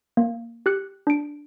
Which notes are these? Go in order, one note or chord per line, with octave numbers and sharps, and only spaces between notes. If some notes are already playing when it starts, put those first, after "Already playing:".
A#3
G4 F#6 C#7
D4 D7